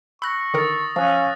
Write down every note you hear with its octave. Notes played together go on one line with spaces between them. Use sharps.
B5 C#6 E6 F#6 A#6
D3 D#3 A#4 D#6 A6
F3 C#4 F5 D#6 F#6